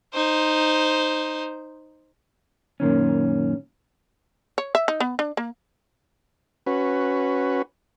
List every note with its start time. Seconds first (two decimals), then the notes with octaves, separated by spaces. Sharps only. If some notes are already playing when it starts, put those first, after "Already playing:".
0.14 D#4 C5
2.80 F#2 A#2 D#3 C#4
4.58 C#5
4.75 E5
4.88 D#4
5.00 B3
5.19 D4
5.37 A#3
6.66 C#4 F#4 B4